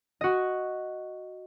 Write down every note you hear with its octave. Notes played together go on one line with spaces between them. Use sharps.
F#4 D#5